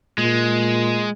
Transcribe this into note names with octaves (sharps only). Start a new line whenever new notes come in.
A#2 G#3